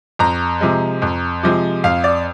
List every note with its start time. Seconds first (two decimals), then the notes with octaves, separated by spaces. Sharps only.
0.19 F2 A#5
0.61 C3 F3 G#3
1.02 F2
1.43 C3 F3 G#3
1.84 F2 F5
2.04 D5